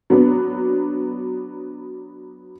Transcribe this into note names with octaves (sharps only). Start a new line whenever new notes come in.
F#3 B3 D4